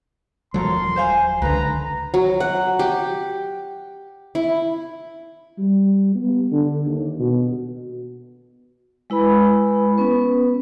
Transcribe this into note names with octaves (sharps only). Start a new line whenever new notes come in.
D#1 F3 F#3 A4 A#4 C6
C5 F5 G#5
C#2 D3 B4 A#5
F#3
F#5
G4
E4
G3
B3
D3
D#2
B2
G#3 E4 B4 B5
B3 C#4 B4